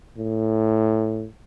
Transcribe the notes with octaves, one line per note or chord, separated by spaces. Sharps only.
A2